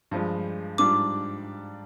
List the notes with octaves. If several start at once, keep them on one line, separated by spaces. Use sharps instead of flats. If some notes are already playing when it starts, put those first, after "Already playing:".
G2 F3 G#3
G#2 G3 D4 F4 D6